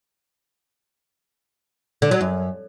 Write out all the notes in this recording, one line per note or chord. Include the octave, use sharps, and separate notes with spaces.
D3
F#3
F#2